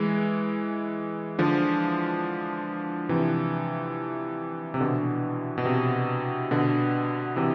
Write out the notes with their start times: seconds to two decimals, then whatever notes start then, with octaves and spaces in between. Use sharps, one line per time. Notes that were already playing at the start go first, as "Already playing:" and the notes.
Already playing: E3 G#3
1.39 D3 F3
3.09 C3 E3
4.74 C3
4.80 B2 D3
5.58 B2
5.65 C3
6.51 B2 D3
7.36 C3 E3